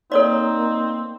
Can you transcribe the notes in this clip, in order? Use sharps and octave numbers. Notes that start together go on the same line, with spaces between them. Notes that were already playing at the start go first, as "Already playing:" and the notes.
A#3 C4 D#4 A4 C#5 D5